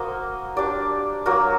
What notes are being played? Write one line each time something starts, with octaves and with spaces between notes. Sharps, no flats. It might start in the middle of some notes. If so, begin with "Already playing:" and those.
Already playing: A#3 F#4 C5 D#5
D4 G4 D5
F#3 A#3 F#4